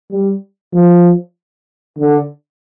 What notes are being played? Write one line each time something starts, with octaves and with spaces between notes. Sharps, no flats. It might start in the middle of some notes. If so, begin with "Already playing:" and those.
G3
F3
D3